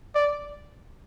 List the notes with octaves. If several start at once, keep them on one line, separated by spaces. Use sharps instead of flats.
D5